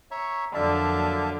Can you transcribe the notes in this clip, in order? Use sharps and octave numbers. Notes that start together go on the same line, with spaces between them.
C#5 E5 A#5 C#6
F2 D3 F#3 A#3 D5 E5 F5 A5